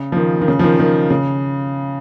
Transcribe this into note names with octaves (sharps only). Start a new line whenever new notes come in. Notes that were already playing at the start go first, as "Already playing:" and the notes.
Already playing: C#3
F3
D#3
D#3
C#3
F3
D#3
D#3
C#3